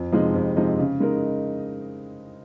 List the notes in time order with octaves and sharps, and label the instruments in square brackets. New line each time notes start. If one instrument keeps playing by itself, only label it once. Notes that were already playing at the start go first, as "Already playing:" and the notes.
Already playing: [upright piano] F2
C3 F3 G#3 D#4
F2
C3 F3 G#3 D#4
C#3
G#3 D#4 A#4